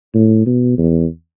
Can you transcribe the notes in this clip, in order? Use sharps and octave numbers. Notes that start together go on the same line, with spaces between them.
A2
B2
E2